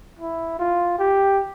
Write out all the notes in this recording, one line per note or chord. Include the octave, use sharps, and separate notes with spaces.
E4
F4
G4